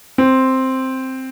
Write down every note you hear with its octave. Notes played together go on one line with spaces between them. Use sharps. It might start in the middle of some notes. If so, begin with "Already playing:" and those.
C4